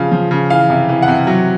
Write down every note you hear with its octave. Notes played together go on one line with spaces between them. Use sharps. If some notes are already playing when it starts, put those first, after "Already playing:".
Already playing: C#3 F3 F5
F3
C#3
E3 F5
C3
E3
F#5
C3
F#3